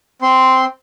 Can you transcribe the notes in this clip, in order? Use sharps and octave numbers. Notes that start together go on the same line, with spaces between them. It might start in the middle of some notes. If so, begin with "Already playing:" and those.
C4 C6